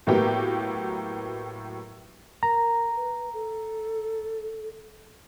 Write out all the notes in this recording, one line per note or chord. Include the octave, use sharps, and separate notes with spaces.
A2 F#3 A#3 B3 G4
A#4 A#5
B4
A4